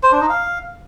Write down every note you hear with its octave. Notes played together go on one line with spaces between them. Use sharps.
C5
D4
D#4
F5